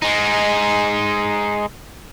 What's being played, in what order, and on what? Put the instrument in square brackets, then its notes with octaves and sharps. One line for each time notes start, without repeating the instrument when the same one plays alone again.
[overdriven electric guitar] G#3 D#4